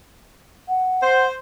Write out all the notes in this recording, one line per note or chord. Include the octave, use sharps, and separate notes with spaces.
F#5
C5